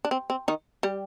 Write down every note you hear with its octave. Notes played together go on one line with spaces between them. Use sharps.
D4
C4
C4
D#3 D#4
G3 G4